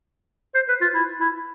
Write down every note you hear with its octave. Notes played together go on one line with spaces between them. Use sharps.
C5
B4
F4
E4
E4